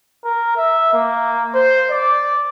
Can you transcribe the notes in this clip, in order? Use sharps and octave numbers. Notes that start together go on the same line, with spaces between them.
A#4
E5
A#3
C5
D5